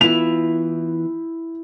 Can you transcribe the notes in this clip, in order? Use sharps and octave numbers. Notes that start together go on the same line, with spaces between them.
E3 B3 E4 F4 F7